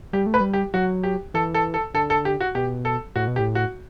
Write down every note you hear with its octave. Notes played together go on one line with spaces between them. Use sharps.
G3 G4
A3
B4
G3
G4
F#3 F#4
G4
E3 A4
A4
A4
D3 A4
A4
G4
F#4
B2 G4
A4
A2 F#4
B2
G4
A2
F#4